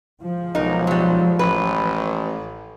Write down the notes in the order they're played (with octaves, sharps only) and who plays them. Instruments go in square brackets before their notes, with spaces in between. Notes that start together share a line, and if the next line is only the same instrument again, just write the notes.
[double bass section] F3 G#3
[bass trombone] B1 [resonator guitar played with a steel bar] D#4 A#4
[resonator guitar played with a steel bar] F#3 G3
[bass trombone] A1 [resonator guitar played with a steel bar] B4